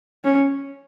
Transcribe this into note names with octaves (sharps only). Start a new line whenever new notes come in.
C#4